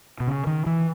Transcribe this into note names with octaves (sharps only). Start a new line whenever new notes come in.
B2
C#3
D#3
E3